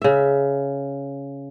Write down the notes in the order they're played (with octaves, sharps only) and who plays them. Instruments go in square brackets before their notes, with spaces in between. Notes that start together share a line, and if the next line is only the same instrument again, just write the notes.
[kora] C#3 E5